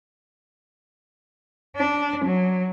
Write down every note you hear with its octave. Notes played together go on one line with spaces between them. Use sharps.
D4
F#3